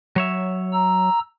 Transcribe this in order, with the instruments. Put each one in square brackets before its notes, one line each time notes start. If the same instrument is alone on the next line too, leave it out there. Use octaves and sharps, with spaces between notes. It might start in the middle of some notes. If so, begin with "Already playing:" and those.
[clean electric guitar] F#3 C#5 E5
[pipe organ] A#5 E6